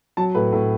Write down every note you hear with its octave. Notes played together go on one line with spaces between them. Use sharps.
F#3 A5
A2 B4
A2